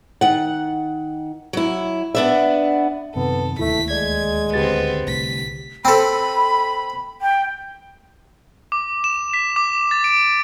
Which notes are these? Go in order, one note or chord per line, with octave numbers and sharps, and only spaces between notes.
D#3 F#5
F#3 E4
B3 D4 E5
F#2 C3 D#3 B3 A4
D1 D#2 A2 A3 E4 B6
G#3 D5 G#6
D3 B3 C4 G4 A6
C2 A2 B6
C4 A4 B5
G5
D6
E7
B6
D6
A6
D7